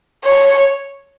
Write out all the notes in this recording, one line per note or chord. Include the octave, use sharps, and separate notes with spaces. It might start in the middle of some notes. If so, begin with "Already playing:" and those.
C#5